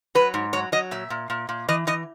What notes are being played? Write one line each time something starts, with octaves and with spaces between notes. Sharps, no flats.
F#3 B4
G#2
F#3 C#5
F#3 D#5
A#2 E5
A#2
A#2
A#2
E3 D#5
E3 D#5